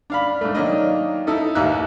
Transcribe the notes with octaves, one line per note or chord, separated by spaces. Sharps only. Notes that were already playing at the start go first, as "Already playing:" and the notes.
D4 F5 B5
G#2 A3
D#3 F#3 A#3 D4 D#5
D#4 E4 A4 D#5
A1 D#2 A#3 E5 E6 F#6